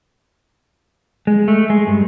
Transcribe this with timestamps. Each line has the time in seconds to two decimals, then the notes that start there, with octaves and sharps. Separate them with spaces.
1.27 G#3
1.48 A3
1.70 G#3
1.87 G2